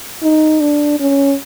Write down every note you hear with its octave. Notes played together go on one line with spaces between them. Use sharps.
D#4
D4
C#4